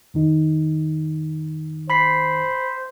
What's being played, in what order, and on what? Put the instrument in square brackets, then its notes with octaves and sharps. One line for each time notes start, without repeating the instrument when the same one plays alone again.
[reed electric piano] F2 D#3 D#4
[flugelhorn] C5 [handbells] B5 B6 C7